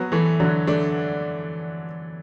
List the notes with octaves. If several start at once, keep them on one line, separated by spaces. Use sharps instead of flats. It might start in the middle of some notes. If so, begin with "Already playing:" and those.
Already playing: F#3 B3
E3 A3
D3 F#3
A3 D4